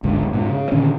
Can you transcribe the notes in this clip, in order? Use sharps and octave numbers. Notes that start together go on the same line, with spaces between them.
G1 C#2 G#2 D3
G#2 B2
C#3
A#2 D3 D#3 C#4